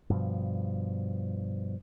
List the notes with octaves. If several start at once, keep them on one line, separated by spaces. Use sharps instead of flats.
G2 B2 F3